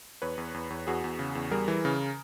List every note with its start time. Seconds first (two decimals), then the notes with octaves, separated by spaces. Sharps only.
0.22 E2 B4 C#5
0.38 E2
0.54 E2
0.70 E2
0.87 E2 F#4 G#4
1.04 E2
1.19 C#3
1.35 E2
1.51 G3 G#4 A#4
1.68 E3
1.85 C#3